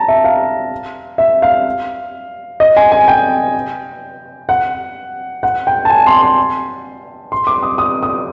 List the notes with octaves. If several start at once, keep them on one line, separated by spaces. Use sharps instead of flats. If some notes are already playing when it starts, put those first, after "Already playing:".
Already playing: A5 A#5
E5
F5
E5
F5
D#5
G#5
G#5
G5
F#5
F#5
G5
A5
G#5
C6
C6
C6
D6
D#6
D#6
D#6